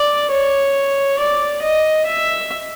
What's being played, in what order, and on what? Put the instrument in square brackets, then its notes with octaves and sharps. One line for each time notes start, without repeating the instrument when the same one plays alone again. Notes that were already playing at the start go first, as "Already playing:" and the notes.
Already playing: [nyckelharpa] D5
C#5
D5
D#5
E5